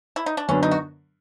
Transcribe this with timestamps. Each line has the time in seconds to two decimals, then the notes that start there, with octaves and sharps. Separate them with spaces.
0.16 E4
0.26 D#4
0.37 D4
0.48 F#2 D3 F#3 B3 C#4 D4
0.63 D#4
0.71 F#4